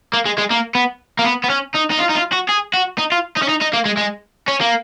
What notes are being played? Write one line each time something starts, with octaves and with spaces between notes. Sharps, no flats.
A#3
G#3
G#3
A#3
B3
A#3
B3
B3
C#4
D#4
D#4
F4
D#4
F4
F#4
G#4
F#4
D#4
F4
D#4
C#4
D#4
D#4
A#3
G#3
G#3
C#4
A#3